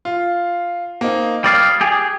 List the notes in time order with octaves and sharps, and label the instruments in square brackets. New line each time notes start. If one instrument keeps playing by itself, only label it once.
[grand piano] F4
A#3 C4 D#4
[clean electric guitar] G3 D5 F5 [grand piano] D#6 G6 G#6
[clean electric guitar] G4 G#4